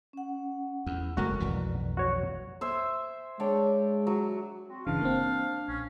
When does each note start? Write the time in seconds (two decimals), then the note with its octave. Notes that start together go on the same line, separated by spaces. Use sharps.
0.13 C#4 F#5
0.86 E2
1.17 F#1 G#3 A3 F#4 A#4
1.40 B1 F2 E3 D5
1.97 F#4 C#5
2.61 C5 E5 G#5
3.40 G#3 D4 C#5 G5
4.07 F#3
4.68 C4 F#4
4.87 G1 C#3 E3 D4 F5
5.01 A#3 C4
5.68 A#1 C#4